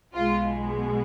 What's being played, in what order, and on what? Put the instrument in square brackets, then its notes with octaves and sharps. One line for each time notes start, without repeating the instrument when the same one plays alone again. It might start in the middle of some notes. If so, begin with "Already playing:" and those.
[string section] B1 B2 G#3 F4